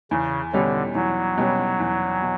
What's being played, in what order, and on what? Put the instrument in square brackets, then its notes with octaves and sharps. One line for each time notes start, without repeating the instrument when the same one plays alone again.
[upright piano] E2 [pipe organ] C#3
[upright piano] B2 G3 C#4 [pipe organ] D3
[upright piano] E2 [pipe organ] F#3
[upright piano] B2 G3 C#4
E2
B2